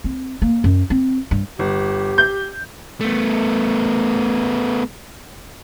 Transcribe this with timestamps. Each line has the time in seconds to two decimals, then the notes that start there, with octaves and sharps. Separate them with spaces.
0.04 C4
0.42 A#3
0.64 F#2
0.90 C4
1.31 G2
1.59 G1 G4
2.18 G6
3.01 A3 B3